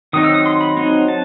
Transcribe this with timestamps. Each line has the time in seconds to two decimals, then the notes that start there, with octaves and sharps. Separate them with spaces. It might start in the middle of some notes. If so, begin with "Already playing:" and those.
0.13 D#3 F#3 C4 D#4 D#6
0.24 E6
0.34 D#6
0.46 C6
0.61 B5
0.77 F#3 C4 D#4
1.08 A5